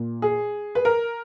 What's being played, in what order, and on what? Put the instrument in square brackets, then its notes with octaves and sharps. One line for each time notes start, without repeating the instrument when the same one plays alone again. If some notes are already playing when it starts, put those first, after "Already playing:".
Already playing: [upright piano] A#2
G#4
B4
A#4